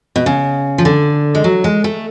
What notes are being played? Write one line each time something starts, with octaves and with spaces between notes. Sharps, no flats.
B2
C#3
F3
D3
G#3
F#3
G#3
A3